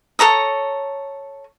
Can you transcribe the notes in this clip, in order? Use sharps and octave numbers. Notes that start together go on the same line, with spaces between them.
A4 C#5 A#5 D#6